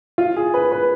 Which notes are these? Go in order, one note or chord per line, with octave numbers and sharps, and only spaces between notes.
F4
G#4
B4
B4